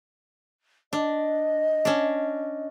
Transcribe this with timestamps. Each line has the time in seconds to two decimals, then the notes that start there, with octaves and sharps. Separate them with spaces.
0.93 D4 D#5
1.85 C#4 D4